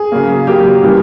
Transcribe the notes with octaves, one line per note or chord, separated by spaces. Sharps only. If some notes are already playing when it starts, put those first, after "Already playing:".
Already playing: G#4
C#3 F#3 A#3
C#3 F#3 A#3 G4
C#3 E3 G3 A#3